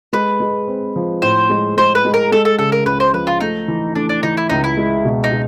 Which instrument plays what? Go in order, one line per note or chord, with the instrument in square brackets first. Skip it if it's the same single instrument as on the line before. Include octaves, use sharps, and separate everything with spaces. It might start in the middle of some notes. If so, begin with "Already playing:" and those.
[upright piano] G#3 [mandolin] B4
[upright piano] G#3
C4
F3
[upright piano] A2 [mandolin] C5
[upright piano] G#3
[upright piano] G#3 [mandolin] C5
[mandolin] B4
[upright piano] G#3
[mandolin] A#4
[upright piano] G#3 [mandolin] A4
[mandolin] A4
[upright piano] C#3 [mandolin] A4
[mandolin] A#4
[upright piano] C#2 [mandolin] B4
[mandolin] C5
[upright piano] F3 [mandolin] B4
[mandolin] F4
[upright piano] A3 [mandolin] D#4
[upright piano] E3
[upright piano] A3 [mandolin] D4
[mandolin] D4
[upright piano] E3 [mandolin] D#4
[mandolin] E4
[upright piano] C#2 [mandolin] D#4
[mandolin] E4
[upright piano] G#3
B2
[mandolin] D#4
[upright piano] B2